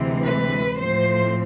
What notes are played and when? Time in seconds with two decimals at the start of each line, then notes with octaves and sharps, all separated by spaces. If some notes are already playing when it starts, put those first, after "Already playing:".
Already playing: D2 C3 E3 G#3
0.24 B4
0.77 A2 F3 A3 C4 C5